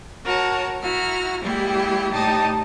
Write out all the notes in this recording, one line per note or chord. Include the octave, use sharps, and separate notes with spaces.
F#4 A#4 C#5 A5
E4 F#4 A#5 F6
G3 G#3 A#3 E4 G4
A2 G3 D#4 G4 A5 D#6